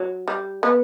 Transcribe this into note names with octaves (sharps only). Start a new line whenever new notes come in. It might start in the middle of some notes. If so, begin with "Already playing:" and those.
Already playing: F#3
G3
B3